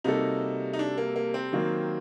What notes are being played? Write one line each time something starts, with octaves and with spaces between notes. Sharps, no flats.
C3 G3 A#3 D#4 F#4 A4
D#4
D4
A#3
A#3
C4
D#3 F#3 A#3